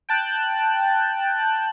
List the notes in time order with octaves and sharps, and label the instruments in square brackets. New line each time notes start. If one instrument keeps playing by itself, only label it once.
[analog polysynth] G5 A5 F#6